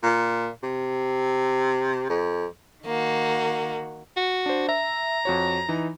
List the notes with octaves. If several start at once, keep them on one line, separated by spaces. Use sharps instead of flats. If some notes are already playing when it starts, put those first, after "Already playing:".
A#2
C3
F2
D#3 A#3 F#4
F#4
D4 C5
E5 A#5
F2 F#4 C#5
E3 D#4